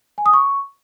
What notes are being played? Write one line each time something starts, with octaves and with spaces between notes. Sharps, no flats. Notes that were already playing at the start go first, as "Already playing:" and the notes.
G#5
D#6
C#6